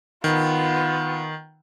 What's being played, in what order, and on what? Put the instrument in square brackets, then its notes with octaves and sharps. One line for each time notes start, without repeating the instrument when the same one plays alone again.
[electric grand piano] D#3 [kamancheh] B3 F4